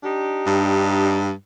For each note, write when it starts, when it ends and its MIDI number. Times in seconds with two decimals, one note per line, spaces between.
0.04 1.33 62
0.04 1.33 63
0.04 1.33 67
0.46 1.32 43